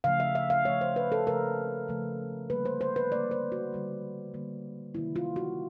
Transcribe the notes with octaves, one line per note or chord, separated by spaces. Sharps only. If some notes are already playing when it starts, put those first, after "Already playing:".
C#3 F3 A3 F5
E5
E5
F5
C#3 F3 A3 C#5
C5
B4
A4
C#3 F3 A3 A#4
C#3 F3 A3
D3 G3 A#3 B4
C5
C5
B4
D3 G3 A#3 D5
C5
F#4
D3 G3 A#3
D3 G3 A#3
C3 D#3 F#3 A#3 E4
F4
F#4